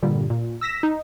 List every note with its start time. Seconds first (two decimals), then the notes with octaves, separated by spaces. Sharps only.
0.02 G2 A#2 D3 G3
0.30 A#2
0.61 E6 A#6 B6 E7
0.83 D#4